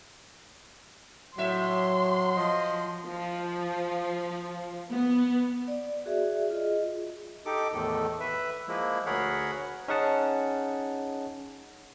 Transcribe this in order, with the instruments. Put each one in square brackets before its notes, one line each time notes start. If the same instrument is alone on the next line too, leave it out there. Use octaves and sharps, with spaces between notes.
[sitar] A2 E5 [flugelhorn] F#3 [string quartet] C6
[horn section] F3 D#5
[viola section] F3
B3
[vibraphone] D5
F#4 G#4 D5 E5
F4 G#4 D#5
[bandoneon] D#4 G4 A4 D6
E2 A2 D#3 A4
B4 E5
F3 G#3 A#3 E4
D2 G#4 A#4 C#5 F#5 B5
[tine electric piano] C#4 D#4 G#4 F#5 A5